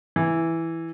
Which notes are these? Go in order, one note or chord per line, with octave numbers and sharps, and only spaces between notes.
E3